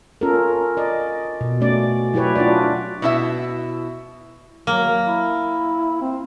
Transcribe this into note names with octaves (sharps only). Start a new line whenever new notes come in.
C#4 F4 A4 A#4
D5 D#5
B2
A3 C#4 D5
F#3 E4 G4 B4 C#5
D4 F4 F#4 D5
B2 E4 E5
F#3 A#3
E4
C4